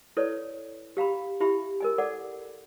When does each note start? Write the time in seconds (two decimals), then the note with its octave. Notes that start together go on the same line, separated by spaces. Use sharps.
0.17 E4 A4 B4 C#5 D5
0.97 G4 F5 A#5 B5
1.40 E4 G4 E5 B5
1.80 A#4 D#5 G#5
1.98 A4 D5 F#5 D6